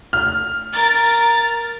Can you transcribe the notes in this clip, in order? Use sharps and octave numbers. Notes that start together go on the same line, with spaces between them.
F6
A#4 A6